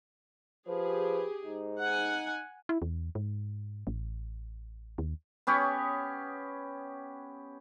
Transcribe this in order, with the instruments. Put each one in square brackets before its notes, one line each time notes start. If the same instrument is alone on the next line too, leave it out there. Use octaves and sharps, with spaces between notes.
[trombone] F3 [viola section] G4 G#4 [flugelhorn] B4
[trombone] G#2 [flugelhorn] D#4
[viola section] F#5 G#5
[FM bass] E4
E2
G#2
A1
D#2
[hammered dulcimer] B3 C#4 G4 C#5